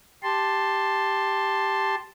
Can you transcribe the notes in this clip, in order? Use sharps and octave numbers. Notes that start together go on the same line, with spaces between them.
G4 A5 C6